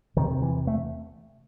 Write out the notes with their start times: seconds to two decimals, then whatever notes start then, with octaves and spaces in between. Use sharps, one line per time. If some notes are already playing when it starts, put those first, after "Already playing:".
0.16 E2 C3 D#3
0.42 E3
0.67 A3